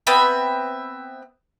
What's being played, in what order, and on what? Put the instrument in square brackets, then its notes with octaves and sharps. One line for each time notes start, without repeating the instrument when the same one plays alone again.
[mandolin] B3 C4 E5 B5